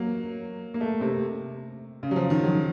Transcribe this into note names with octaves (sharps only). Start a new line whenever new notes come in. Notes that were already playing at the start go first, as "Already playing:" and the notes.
Already playing: F#3 A#3
A#3
A3
C3
C#3
F#3
F3
D#3
F#3